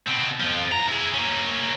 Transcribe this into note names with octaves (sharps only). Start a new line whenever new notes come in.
B2 C4
F2 F3
B1 A#5
E4 G#4
A#3 C#4